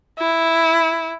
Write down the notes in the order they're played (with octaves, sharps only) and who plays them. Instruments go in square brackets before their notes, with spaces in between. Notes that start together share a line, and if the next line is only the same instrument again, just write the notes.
[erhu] E4